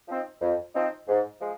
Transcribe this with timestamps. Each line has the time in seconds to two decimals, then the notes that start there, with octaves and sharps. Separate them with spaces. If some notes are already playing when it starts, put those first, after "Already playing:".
0.08 F3 C4 D#4
0.41 F2
0.75 F3 C4 D#4
1.08 G#2
1.41 F3 G#3